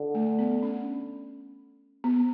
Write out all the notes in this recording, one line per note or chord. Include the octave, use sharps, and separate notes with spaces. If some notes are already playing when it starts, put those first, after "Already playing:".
Already playing: D3
A3
B3
C#4
B3